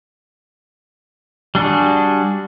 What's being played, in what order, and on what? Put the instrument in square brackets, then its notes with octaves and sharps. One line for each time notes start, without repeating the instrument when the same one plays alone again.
[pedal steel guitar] G3 D4 F#4 G#4